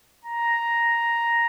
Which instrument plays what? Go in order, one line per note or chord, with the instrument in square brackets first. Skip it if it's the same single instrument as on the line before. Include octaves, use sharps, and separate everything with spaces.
[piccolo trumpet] A#5